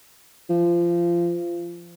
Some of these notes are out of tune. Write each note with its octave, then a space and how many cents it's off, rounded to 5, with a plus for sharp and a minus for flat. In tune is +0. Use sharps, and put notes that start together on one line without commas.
F3 -25